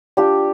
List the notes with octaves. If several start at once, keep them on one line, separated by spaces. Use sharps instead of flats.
G3 D4 F4 G4